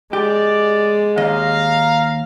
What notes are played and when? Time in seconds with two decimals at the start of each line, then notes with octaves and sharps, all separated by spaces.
0.13 G#3 G4 D5
1.17 D#2 D#5 F5 A#5